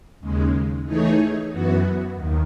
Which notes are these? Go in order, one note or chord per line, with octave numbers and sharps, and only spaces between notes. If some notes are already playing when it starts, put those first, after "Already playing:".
D#2 C#3 G#3
E3 A3 D#4 G#4 C#5
F#2 E3 B3 F#4
D#2 D#3